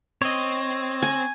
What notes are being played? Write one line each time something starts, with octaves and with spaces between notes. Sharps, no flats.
C4 C#5 D#5
G#5